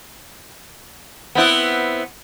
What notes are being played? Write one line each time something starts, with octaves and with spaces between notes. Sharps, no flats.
B3 C4 E4